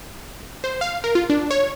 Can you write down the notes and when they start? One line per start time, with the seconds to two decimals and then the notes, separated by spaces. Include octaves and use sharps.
0.64 C5
0.81 F5
1.04 A#4
1.15 F4
1.30 D4
1.51 C#5